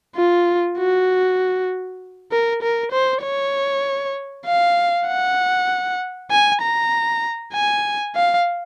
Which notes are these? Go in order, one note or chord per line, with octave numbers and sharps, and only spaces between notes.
F4
F#4
A#4
A#4
C5
C#5
F5
F#5
G#5
A#5
G#5
F5